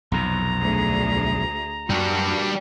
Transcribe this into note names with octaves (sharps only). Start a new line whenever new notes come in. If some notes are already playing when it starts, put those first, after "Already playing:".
B1 F2 C3 A#5
D2 G#4
F#2 G3 A#3 D4 F#4